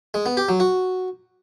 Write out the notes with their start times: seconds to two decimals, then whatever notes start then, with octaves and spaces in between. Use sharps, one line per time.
0.14 G#3
0.26 B3
0.37 G4
0.49 F#3
0.60 F#4